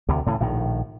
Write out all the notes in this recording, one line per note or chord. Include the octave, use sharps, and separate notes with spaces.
D2 C3
A2 C#3 E3
A#1 A2 D#3